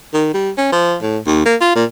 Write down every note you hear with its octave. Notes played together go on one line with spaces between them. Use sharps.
D#3
G3
C#4
F3
A2
D#2
A#3
F4
A#2